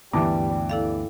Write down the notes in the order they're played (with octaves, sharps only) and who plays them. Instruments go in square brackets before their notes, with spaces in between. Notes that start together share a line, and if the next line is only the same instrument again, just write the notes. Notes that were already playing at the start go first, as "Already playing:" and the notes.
[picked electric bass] D2 B3 [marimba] G2 [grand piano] E3 A5 D6 [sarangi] G3
[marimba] E4 A4 F5 [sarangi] D5